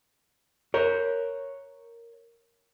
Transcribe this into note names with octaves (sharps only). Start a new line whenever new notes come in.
A#4 C#5